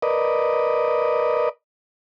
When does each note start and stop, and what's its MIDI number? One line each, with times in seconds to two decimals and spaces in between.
0.02 1.49 70
0.02 1.49 71
0.02 1.49 74
0.02 1.49 75